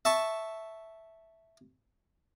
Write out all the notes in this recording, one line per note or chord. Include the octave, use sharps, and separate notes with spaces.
E5 A5 C#6